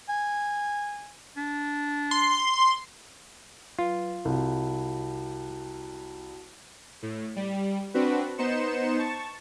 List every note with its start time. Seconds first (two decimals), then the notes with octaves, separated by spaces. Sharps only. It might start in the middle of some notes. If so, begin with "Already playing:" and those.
0.09 G#5
1.37 D4
2.11 C6
3.79 F#3 F4 B4
4.25 C2 F#4 G5 A5
7.02 A2
7.36 G3
7.94 C4 D4 F#4 B4
8.38 B3 D#4 C5 C#7 E7
8.98 A5 C#6